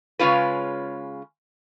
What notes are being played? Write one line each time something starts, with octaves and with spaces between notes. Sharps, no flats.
C#3 G#3 C#4 F4 B4